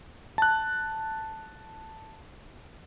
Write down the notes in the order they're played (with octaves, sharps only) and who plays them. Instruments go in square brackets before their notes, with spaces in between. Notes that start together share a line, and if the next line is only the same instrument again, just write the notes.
[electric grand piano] A5 F#6